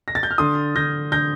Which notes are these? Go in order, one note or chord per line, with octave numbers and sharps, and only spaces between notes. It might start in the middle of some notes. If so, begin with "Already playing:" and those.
A#6
A6
G6
F6
D3 C6 D#6
D3 G6 A#6
D3 G6 A#6